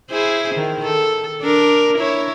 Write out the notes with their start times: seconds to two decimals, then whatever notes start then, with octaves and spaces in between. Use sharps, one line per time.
0.10 E4 G#4 C5
0.55 D#3
0.84 A4
1.41 D4 A#4
1.97 E4 C#5